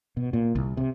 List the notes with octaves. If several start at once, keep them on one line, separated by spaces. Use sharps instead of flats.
B2
A#2
C2
C3